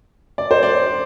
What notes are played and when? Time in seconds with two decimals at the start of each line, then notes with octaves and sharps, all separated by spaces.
0.38 D5
0.51 C5
0.63 D5